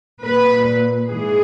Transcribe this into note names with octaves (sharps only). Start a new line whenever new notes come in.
A#2 B4
G#2 E3 G#4